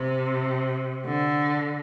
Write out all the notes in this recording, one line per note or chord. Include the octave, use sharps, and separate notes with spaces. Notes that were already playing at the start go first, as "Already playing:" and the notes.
Already playing: C3
D3